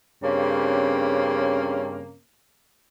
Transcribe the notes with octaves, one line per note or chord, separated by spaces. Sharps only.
G2 C#3 A#3 C4 C#4